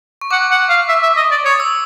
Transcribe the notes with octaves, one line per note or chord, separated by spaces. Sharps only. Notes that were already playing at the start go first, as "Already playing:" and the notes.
C#6
F#5 D6
F#5
F5
E5
E5
D#5
D5
C#5 D#6
E6